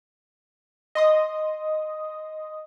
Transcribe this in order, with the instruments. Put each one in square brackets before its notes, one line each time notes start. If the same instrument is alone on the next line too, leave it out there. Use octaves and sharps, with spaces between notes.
[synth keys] D#5 C6 D#6